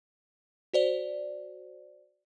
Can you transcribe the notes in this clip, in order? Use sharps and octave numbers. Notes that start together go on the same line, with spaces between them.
F#4 C5 D5